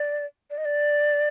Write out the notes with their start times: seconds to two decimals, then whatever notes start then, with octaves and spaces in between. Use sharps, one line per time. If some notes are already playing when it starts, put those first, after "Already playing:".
Already playing: D5
0.50 D5
0.58 D#5
0.65 D5